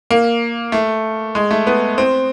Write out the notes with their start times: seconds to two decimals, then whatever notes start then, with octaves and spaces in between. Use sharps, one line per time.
0.11 A#3
0.72 A3
1.35 G#3
1.51 A3
1.67 B3
1.98 C4